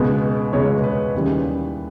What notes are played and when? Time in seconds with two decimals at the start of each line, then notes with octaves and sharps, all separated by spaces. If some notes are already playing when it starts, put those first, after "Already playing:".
Already playing: C#2 B2 G#3 B3
0.53 C#2 B2 G#3 B3 C#5
0.84 B4
1.14 D#2 C#3 E3 G3